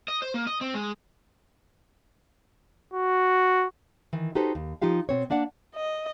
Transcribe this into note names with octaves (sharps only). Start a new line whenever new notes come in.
D#5
C5
A#3
D#5
C4
G#3
F#4
D#3 E3
D#4 F#4 G4 A4 B4 C5
D#2
F3 D#4 F4 G4 F5
B2 C4 C#5
A#3 D4 D5 F#5
D#5